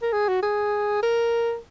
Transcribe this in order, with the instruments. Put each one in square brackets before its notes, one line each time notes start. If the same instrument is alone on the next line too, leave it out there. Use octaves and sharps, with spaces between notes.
[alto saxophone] A#4
G#4
F#4
G#4
A#4